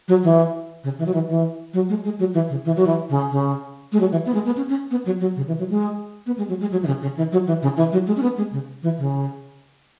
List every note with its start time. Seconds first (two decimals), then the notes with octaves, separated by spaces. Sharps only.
0.08 F#3
0.24 E3
0.84 C#3
0.99 E3
1.06 F#3
1.14 E3
1.29 E3
1.74 F#3
1.89 G#3
2.04 G#3
2.19 F#3
2.34 E3
2.50 C#3
2.65 E3
2.76 F#3
2.87 E3
3.10 C#3
3.31 C#3
3.92 G#3
4.00 F#3
4.12 E3
4.26 B3
4.34 G#3
4.46 B3
4.57 C#4
4.68 C#4
4.91 B3
5.06 F#3
5.21 F#3
5.36 C#3
5.47 E3
5.59 F#3
5.70 G#3
6.26 B3
6.38 G#3
6.49 F#3
6.60 G#3
6.72 F#3
6.83 E3
6.87 C#3
7.02 C#3
7.17 E3
7.32 F#3
7.47 E3
7.62 C#3
7.77 E3
7.92 F#3
8.07 G#3
8.17 C#4
8.22 B3
8.37 G#3
8.52 C#3
8.83 E3
8.98 C#3